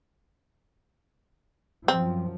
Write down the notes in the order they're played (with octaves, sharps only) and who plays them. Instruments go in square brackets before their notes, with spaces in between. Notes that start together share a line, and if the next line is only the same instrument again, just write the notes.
[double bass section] F#2 F3 [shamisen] C4